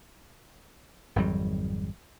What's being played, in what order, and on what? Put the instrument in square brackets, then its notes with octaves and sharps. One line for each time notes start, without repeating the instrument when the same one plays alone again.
[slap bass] G#1 F2 F#3 G3